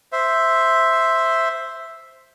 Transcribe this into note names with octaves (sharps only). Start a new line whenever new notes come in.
C5 E5